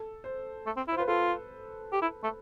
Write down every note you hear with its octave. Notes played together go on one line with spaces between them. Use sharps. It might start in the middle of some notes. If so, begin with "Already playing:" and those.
Already playing: A4
C5
A3
C4
E4
C5
F4
B4
F4 A4
G4
E4
A3